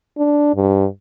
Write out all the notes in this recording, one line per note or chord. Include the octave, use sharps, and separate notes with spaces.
D4
G2